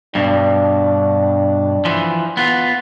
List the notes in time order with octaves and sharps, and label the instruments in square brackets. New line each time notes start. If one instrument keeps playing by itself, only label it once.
[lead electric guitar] G2 B2 [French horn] D4
[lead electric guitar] E3 F3
B3 F4